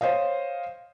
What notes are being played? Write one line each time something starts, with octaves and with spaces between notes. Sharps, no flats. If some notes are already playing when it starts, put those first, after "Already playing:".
C5 C#5 D#5 F5